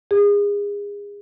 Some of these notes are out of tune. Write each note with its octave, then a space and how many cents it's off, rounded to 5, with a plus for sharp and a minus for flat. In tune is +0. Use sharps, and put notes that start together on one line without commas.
G#4 -30